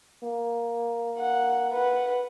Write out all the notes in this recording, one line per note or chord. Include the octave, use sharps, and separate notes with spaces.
A#3
F#5
B4 F#5